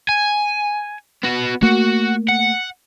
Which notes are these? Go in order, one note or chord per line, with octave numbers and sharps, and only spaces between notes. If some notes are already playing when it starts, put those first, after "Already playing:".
G#5
B3 F#4
A3 A#3 F#4
F#5